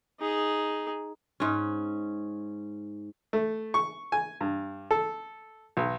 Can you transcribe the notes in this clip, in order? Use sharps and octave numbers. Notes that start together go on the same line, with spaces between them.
D#4 G#4
G#2 C#4
A3
C#6
G#5
G2
A4
B1